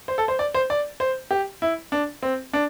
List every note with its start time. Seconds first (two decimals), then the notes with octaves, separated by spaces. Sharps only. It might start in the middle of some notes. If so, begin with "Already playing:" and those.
0.08 C5
0.18 A4
0.28 C5
0.39 D5
0.54 C5
0.70 D5
1.00 C5
1.31 G4
1.62 E4
1.92 D4
2.23 C4
2.53 D4